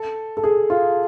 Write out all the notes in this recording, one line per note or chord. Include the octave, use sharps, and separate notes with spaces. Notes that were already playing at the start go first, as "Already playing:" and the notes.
Already playing: A4
A4
G#4
F4